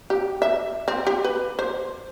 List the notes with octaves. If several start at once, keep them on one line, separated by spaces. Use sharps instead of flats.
G4
E5
C4
G4
B4
C5